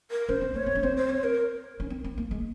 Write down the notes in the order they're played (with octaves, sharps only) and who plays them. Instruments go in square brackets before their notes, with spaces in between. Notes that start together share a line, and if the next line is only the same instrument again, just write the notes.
[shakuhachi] A#4
[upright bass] C#4 [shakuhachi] C5
[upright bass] C4
[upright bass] A#3 [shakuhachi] C#5
[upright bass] C4
C#4
[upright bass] C4 [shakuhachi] C5
[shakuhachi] C5
C#5
A#4
[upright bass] C#4
C4
C4
A#3
G#3